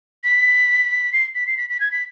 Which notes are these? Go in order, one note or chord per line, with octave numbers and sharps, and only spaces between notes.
B6
C7
B6
C7
B6
B6
G#6
B6